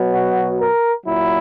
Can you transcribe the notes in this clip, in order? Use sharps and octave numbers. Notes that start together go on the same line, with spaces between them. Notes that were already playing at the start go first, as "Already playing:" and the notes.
Already playing: B2 F#3
F#4
A#4
A#2 F#3 E4